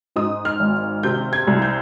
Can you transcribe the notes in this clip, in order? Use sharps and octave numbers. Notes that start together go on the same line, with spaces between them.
G#2 D#6
F6
G#1
C3 G6
G#6
C2
G6